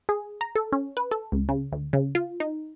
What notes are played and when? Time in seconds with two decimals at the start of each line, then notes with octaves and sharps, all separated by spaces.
0.09 G#4
0.41 A#5
0.56 A4
0.72 C#4
0.97 B4
1.11 A4
1.32 C#2
1.49 C#3
1.72 D2
1.93 C#3
2.15 F4
2.40 D#4